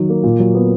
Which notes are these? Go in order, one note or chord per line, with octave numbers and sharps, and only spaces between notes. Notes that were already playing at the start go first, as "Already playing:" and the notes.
Already playing: D#3 F#3
A#3
A#2
F#3
B3